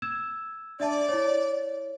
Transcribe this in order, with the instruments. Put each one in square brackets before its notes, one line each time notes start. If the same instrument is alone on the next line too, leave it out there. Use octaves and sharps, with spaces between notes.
[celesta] E6 G#6 E7
[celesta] D4 E5 A5 [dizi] D5
[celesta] E4 C#5